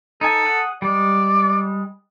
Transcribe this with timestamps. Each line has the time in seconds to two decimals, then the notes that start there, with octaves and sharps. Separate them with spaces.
0.21 D#4 A4 G#5
0.45 G#4 F#5
0.82 G3 G#3 D5